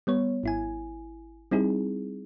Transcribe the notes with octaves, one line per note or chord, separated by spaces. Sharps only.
G3 B3 C#5
G#1 E4 G#5
G3 C4 D#4 E4 G#4